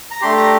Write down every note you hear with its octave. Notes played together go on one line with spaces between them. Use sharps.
A#5
A3 D4 G4 C6
A#5